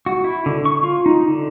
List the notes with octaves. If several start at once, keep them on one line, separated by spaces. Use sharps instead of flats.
F#4
E4
D3
C#6
F4
D#4
D3